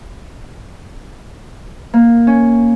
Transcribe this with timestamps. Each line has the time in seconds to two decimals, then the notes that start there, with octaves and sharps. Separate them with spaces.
1.94 A#3
2.27 C#4